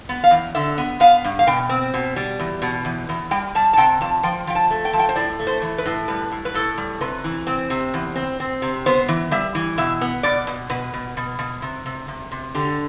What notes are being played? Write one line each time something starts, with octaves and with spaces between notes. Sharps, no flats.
B3
F5
E2
D3 E5
B3
B3 F5
G2
F5
B2 G5
C4
B2
G3
E2
B2
E2
E2
G3 G5
G3 A5
A5
C3 G5
F2 A5
F3 G5
F3 G5
A5
A3
G5
F3 A5
G5
C5
A2 D5
A3
C5
E3
B4
A2
G3 B4
A2
B4
A2 A4
G3
C3 B4
E3
C4
C3
E2
C4
C4
C3
B3 C5
E3
G3 E5
E3
B2 E5
B3
B2 D5
B2
B2 B4
B2
B2
B2
C3
C3
C3
C3
D3 G4